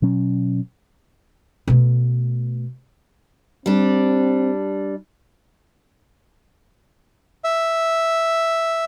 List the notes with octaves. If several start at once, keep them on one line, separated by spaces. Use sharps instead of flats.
B2 F#3 C#4
B2 A3
G3 C4 D4
E5